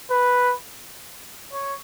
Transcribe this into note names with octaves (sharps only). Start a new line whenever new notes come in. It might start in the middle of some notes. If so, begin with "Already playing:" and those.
B4
C#5